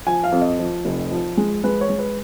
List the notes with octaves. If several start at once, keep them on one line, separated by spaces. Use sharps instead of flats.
F3 G#5
F5
F2
D#5
F3
F1
F3
G#3
G#3 B4
C#5
G#3
B4